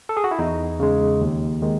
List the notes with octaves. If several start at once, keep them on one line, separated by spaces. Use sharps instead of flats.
A4
G#4
F#4
E4
E2 D#4
C#3 G#3
D#2
D#3 G#3